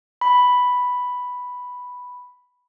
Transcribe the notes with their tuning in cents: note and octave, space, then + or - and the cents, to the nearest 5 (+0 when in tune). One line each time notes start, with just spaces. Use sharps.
B5 +0